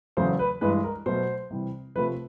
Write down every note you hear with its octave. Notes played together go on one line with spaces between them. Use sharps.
E2 C#3 F#3 A3 C5
B4
G2 E3 G#3 B4
A#4
B2 F#3 A3 C5
C3 E3 G3
C3 F3 A3 B4